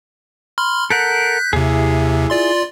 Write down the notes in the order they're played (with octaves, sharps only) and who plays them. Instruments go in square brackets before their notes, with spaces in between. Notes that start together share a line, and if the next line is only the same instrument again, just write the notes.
[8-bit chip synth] B5 C6 F6
[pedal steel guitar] A4 A#4 F#5 [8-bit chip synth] F#6 G6 B6
[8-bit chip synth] D#2 C3 [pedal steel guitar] E4 G#4
[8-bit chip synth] F4 D5 C6